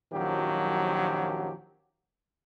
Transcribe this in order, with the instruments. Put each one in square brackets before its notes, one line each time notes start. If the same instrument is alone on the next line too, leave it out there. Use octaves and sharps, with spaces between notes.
[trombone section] A#1 F#2 D#3 F3 F#3 G4